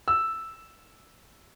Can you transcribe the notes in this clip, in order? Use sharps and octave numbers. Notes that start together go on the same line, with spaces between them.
E6